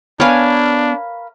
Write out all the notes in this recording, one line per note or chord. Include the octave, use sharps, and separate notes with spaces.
B3 D4 A#4 B4 C#5 F5 G#5